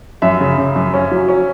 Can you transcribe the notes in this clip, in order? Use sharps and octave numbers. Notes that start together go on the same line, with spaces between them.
F#2 E5
C#3
C#3
F#2
C#4
F#3
C#4